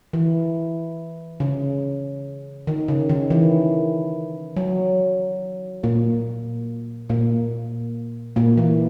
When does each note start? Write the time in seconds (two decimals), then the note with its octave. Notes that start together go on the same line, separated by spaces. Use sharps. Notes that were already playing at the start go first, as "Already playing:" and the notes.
0.13 E3
1.40 C#3
2.67 D#3
2.88 C#3
3.09 D#3
3.30 E3
4.57 F#3
5.83 A#2 A#3
7.09 A#2 A#3
8.36 A#2 A#3
8.57 E3